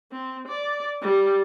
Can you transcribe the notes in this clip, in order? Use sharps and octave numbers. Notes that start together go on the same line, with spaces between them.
C4
D5
G3